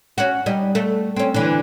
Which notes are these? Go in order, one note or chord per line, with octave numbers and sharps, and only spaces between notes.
C#4 F#4
G3 D#4
A3
C4 C#4
D3 E3